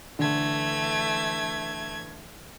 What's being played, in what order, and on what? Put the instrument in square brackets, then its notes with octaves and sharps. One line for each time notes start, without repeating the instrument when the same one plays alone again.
[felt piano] D3 [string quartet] E3 A3 G#6